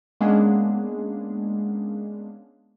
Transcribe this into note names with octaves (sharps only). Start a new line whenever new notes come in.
G#3 A#3 B3 C#4 D4 G#4